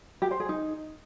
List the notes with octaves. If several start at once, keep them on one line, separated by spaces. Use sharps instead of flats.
G4
C5
G#4
D#4